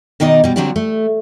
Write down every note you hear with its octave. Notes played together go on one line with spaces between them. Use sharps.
B2 D#3 D#4 D5 D#5
B2 G3
D3 F#3 G3 C4 D4 G4
A3